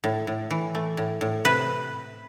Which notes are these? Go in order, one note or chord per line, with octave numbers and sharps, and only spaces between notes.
A2
A2
E3
A3
A2
A2
C3 B4